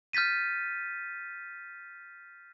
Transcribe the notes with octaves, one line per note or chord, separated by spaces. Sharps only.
F6 G6 A6 B6 D#7